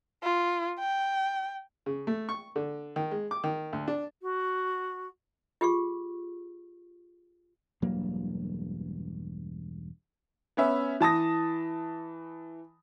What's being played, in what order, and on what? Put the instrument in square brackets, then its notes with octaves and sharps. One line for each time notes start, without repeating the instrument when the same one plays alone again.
[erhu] F4
G5
[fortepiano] C#3
A3
C#6
D3
D#3
G#3
D6
D#3
D2
D4
[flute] F#4
[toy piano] F4 G4 G#4 C#6
[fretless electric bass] E1 G2 F#3 A#3
[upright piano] B3 C#4 E5
E3 A5 D#6 A#6